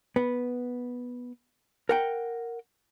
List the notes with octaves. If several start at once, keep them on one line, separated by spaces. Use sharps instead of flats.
B3
A#4 F#5 G5